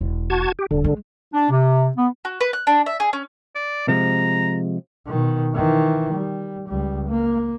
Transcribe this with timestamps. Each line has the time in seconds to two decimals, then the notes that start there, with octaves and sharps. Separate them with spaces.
0.01 E1
0.30 F#4 A5 G#6
0.59 G4
0.71 D#1 D3
0.84 G#3
1.34 D4
1.50 C3
1.96 B3
2.25 F#4
2.41 B4
2.53 F#6
2.67 D4
2.86 E5
3.00 G#4
3.13 C#4
3.55 D5
3.88 C3 F3 G#3 A#5
5.07 B2 D#3
5.55 D#3 E3
6.13 G3
6.68 C#2 G3
7.09 A#3